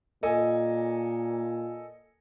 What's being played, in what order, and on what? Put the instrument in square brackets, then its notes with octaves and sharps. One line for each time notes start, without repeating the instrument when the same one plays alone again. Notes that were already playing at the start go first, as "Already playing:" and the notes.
[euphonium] A#2 [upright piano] A4 D#5 G#5